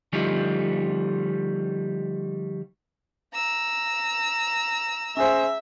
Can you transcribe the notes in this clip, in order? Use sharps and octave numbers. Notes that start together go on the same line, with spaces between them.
D3 F3 G3 A3 D#4
A#5 E6
C#4 G#4 C5 E5